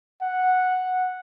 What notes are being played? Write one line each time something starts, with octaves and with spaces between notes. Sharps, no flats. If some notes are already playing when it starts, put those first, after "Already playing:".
F#5